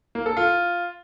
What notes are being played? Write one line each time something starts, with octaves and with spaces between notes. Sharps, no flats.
A#3
A4
F4